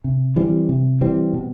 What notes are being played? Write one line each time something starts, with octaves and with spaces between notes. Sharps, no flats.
C3
E3 G3 C4
C3
E3 G3 C4
B2